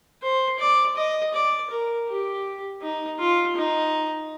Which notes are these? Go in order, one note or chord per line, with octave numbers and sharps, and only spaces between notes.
C5
D5
D#5
D5
A#4
G4
D#4
F4
D#4